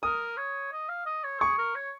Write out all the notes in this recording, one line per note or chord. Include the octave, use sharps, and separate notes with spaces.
A#4 D#6
C#5
D#5
F5
D#5
C#5
G#4 C#6
A#4
C#5